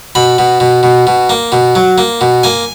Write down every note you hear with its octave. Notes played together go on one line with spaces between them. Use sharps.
B2 B5
B2
B2
B2
B2
A#3
B2
F#3
A#3
B2
A#3 G#5